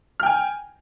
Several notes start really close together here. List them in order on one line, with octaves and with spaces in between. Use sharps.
F6 G5 G#5